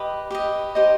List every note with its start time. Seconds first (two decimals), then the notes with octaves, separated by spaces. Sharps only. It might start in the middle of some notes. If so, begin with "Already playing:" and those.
Already playing: G4 B4 D#5
0.31 G4 B4 D#5
0.75 D#4 G4 C5 D#5